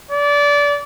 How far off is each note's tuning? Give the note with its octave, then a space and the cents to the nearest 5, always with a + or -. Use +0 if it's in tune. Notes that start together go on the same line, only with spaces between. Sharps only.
D5 -25